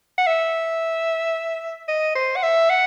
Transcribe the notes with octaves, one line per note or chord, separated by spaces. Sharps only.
F#5
E5
D#5
C5
F#5
E5
F#5